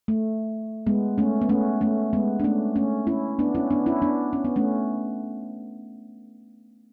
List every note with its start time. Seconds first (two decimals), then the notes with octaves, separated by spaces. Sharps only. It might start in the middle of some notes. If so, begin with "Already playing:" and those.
0.08 A3
0.86 G#3 B3
1.18 A3 C#4
1.42 B3
1.49 A3 C#4
1.81 A3 C#4
2.13 G#3 B3
2.40 D4
2.44 A3 C#4
2.76 A3 C#4
3.07 C#4 E4
3.39 B3 D4
3.55 C#4 E4
3.71 B3 D4
3.86 C#4 E4
4.02 B3 D4
4.33 C#4
4.45 B3
4.56 A3 C#4